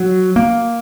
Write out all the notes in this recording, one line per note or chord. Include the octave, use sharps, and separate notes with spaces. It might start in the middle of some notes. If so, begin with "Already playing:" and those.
Already playing: F#3
A#3